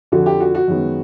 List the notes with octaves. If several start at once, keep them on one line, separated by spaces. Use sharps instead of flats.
F2 D3 F3 F#4
G4
F#4
F#4
F#2 D#3 G#3 B3